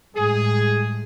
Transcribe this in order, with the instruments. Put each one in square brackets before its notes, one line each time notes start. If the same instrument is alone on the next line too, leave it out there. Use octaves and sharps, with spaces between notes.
[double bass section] A2 G3 G#3 [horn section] G#4